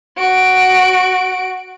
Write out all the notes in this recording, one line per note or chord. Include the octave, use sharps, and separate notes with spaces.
F#4 D7